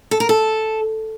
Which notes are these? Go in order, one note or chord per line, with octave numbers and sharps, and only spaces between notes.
A4
A#4
A4